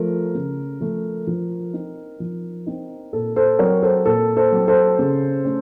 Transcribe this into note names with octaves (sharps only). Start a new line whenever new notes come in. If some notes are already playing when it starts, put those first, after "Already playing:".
Already playing: F3 A3 A#4
C#3
F3 A3
F3
C4 D#4
F3
C4 D#4
A#2 A4
A4 C5
F#3 C4 A#4 C#5
A4 C5
A#2 A4
A4 C5
F#3 C4
A4 C5
C#3
A3 C#4